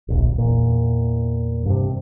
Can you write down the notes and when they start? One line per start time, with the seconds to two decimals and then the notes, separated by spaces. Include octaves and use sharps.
0.08 D1 A#1
0.38 E2 A#2
1.66 G2 C3